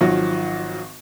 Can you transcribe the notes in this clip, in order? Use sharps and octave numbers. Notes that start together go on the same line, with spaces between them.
G#1 D#3 F3 F#3